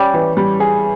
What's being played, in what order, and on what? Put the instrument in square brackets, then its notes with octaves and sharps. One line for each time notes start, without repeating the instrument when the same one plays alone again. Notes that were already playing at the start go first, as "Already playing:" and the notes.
Already playing: [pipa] G3 [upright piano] C#4
[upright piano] E3
G3
G#4